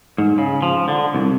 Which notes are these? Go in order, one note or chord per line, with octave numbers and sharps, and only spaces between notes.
G#2
C#3
F3
D3
C2